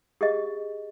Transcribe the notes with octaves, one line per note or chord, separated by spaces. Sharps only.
G4 G#4 D#5